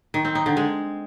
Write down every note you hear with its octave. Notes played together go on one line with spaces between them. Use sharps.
D#3
C4
D#4
D3
G#3